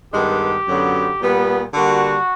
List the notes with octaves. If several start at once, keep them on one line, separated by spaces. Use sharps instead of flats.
G2 D#3 G#3 B3 G4
F#2 D3 F#3 B3
A#2 G3 B3
D3 G3 A#3 F#4